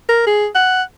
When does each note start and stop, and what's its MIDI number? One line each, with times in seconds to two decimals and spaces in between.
0.09 0.24 70
0.27 0.47 68
0.55 0.82 78